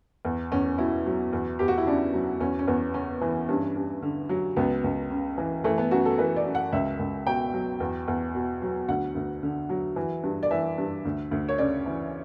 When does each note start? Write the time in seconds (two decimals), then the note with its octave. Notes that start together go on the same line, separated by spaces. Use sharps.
0.25 E2
0.52 E2 C#4
0.78 B2 E4
1.06 F#3
1.33 E2
1.59 E2 G4
1.68 F#4
1.78 E4
1.86 C#3 D4
2.14 F#3
2.40 E2 C#4
2.59 C#4
2.67 E2 B3
2.94 C#3 C#4
3.21 E3
3.49 G2 C#4
3.76 G2
4.02 D3
4.29 F#3
4.57 C#2 B3
4.84 C#2
5.11 C#3
5.38 E3
5.64 E3 A3
5.78 B3
5.91 F#2 F#4
6.05 A4
6.18 E3 B4
6.36 D5
6.45 F#2
6.55 F#5
6.72 C#2 E5
6.99 C#2
7.27 B2 G5
7.54 F#3
7.80 E2
8.08 E2
8.35 B2
8.62 F#3
8.88 D2 F#5
9.15 D2
9.43 D3
9.69 F#3
9.96 E3
10.23 G2
10.43 D5
10.51 E3 E5
10.78 G2
11.05 D2
11.31 D2
11.49 C#5
11.58 C#3 D5
11.86 E3